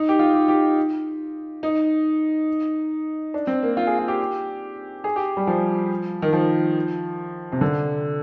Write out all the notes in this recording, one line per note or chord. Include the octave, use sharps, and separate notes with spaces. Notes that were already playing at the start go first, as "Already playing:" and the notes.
Already playing: D#4
G4
F4
G4
G4
D#4
D4
C4
A#3
F4
G#4
F4
G4
G#4
G4
G3
F3
D#3
F3
C3
D3